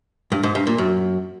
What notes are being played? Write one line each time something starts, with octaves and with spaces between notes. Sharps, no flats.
G2
G#2
G2
A#2
F#2